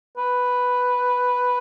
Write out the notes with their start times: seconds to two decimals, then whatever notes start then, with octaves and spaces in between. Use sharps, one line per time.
0.17 B4